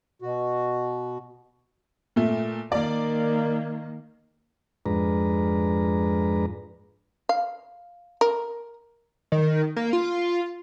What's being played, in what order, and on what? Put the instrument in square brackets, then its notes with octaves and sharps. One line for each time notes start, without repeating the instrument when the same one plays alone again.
[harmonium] B2 F#4
[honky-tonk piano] A#2 A3
[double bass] D#3 A#3 [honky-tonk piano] D5
[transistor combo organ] F2 G#2 G#3 D4 B4 A#5
[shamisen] F5
A#4
[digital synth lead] D#3
A#3
F4